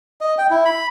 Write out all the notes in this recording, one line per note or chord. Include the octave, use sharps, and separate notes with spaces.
D#5
G5
E4
B5